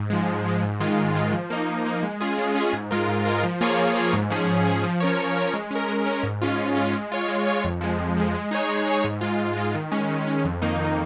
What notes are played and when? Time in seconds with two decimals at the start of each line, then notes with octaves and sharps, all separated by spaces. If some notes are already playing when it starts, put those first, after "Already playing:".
Already playing: G#2
0.10 F3 G#3
0.27 G#2
0.46 F3 G#3
0.63 G#2
0.80 D#3 G#3 F4
0.98 G#2
1.15 D#3 G#3 F4
1.33 F3
1.50 A#3 D#4
1.68 F3
1.85 A#3 D#4
2.03 G#3
2.21 C#4 F4 G#4
2.38 G#3
2.55 C#4 F4 G#4
2.73 G#2
2.91 G#3 F4 A#4
3.08 G#2
3.25 G#3 F4 A#4
3.43 F3
3.61 A#3 F4 G#4 C#5
3.79 F3
3.96 A#3 F4 G#4 C#5
4.13 G#2
4.30 F3 C#4 G#4
4.48 G#2
4.65 F3 C#4 G#4
4.83 F3
5.00 C#4 A#4 C#5
5.18 F3
5.37 C#4 A#4 C#5
5.54 G#3
5.71 C#4 A#4
5.88 G#3
6.06 C#4 A#4
6.23 G#2
6.42 G#3 C#4 F4
6.59 G#2
6.76 G#3 C#4 F4
6.93 G#3
7.12 F4 C#5
7.28 G#3
7.47 F4 C#5
7.64 F2
7.81 F3 G#3
7.99 F2
8.17 F3 G#3
8.35 G#3
8.51 D#4 G#4 C#5
8.69 G#3
8.87 D#4 G#4 C#5
9.04 G#2
9.21 G#3 F4
9.39 G#2
9.57 G#3 F4
9.75 D#3
9.92 G#3 C#4
10.09 D#3
10.27 G#3 C#4
10.45 F2
10.62 D#3 A#3 D#4
10.80 F2